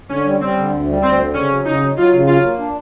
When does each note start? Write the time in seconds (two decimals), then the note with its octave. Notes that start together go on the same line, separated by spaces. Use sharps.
0.10 D3 C#4
0.25 G3
0.40 G3 C4
0.57 D3
0.72 D2
0.88 G3
1.02 D2 C4
1.18 D3
1.34 C#3 C#4
1.49 F#3
1.65 C#3 D#4
1.81 F#3
1.97 F#3 F4
2.12 C#3
2.27 F#3 F4
2.42 A#3
2.58 D4